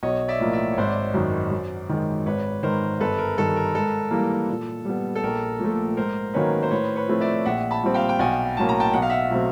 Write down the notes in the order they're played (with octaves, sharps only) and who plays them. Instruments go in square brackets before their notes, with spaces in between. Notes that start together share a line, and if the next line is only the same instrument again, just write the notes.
[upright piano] B1 [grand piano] C#5 D#5
[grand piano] D5 E5
[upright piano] A2 F3 A#3
[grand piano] D5 E5
C#5
[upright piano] G#1 [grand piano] C5 D5
[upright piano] F#2 D#3
F#2
D#3 G#3
[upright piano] G#1 [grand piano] B4 C#5
[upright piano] G#2 D#3 [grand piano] A#4 C5
[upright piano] G1 [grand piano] A4 B4
[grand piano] A#4
[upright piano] G2 D#3 [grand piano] A4
[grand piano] A#4
[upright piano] G#2 [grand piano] A4
[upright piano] E3 G3 A#3
A#2
G3 B3
[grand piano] A4
[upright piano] A#1 [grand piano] A#4
[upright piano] A#2 F3 A3
[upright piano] G#2 [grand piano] A#4 C5
[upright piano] D#3 F#3 A#3 C#4 [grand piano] B4 C#5
[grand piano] C5
[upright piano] A2 [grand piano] B4 C#5
[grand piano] B4 C#5
[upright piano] F3 A3 C4 E4
[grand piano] D5 E5
[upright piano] A#1 [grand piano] E5 F#5
[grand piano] A5 B5
[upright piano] A#2 G3 C4
[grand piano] F5 G5
G5
[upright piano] B1 [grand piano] F#5 G#5
[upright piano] A2 F#3 A#3 C#4 [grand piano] A5
[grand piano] A#5
G5 A5
[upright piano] B1 [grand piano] F#5
[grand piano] F5
E5 F#5
[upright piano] B2 F#3 A3 C4